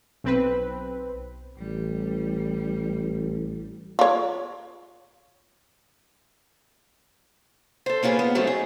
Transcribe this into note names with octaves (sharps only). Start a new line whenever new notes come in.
B1 C4 B4
A1 G3
F4 C#5
A4 C5
A#3 C#4 F4 F#4 G#4 B4
B3 F4
G#2 F#3 A3 C4 C#4 D#4
G#4